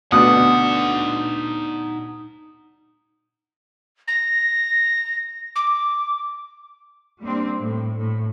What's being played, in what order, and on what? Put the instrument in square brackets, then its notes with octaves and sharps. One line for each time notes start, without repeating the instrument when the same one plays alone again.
[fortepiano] D2 B2 D4 [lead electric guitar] D#4 F#5 [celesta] D#6
[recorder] A#6
D6
[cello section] G3 A#3 C4 D4
A2
A2